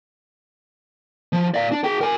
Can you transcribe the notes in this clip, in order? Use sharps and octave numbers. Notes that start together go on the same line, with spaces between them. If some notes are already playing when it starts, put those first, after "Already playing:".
F3
D5 F5
D4
G#4 G5
A#4 G#5